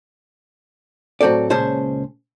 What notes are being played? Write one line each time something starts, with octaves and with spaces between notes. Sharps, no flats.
A2 F#3 C4 A4 D5
C#2 A#2 C#4 G#4 C5 A5